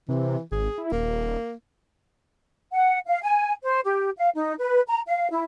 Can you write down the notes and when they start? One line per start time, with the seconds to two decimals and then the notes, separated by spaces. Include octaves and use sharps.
0.09 C3 E3
0.52 G#1 G#4
0.78 E4
0.92 D#1 A#3
2.72 F#5
3.07 F5
3.22 G#5
3.63 C5
3.83 G4
4.16 F5
4.34 D#4
4.58 B4
4.87 A#5
5.07 F5
5.30 E4